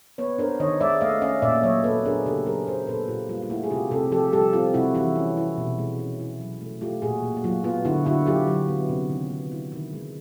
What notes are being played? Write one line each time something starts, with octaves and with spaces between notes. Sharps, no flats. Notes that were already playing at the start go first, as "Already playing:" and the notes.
B3 B4 C#5
D4 A#4 C5
D#3 C#5 D#5
G#3 D5 E5
A3 D#5 F5
C#4 D#5 F5
A#2 D5 E5
F#3 C#5 D#5
B3 A4 B4
D4 G#4 A#4
C#3 G4 A4
F#3 G#4 A#4
B3 A#4 C5
A#2 A4 B4
A#2 F4 G4
G3 F4
F4
A3 E4 F#4
G#4
C3 F4 G4
C3 G4 A4
F3 G4 A4
G3 G4 A4
C4 F4
C3 E4 F#4
E3 E4 F#4
C#4
E4
B2
G#3
C#4
E4
F#3
A3
A3 F4 G4
A#2 F#4 G#4
A#2
F#4
F#3 F4
B3 F4
D3 E4 F#4
D3 E4 F#4
F#3 F4 G4
F#3
B3
C3
D#3
B3
E4
D#3
G#3